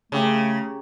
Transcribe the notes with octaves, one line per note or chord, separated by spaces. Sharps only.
C#3 A3 C#4 G4 A#4